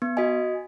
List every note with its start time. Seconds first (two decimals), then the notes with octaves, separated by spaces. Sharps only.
0.02 B3
0.17 F#4 D#5 G#5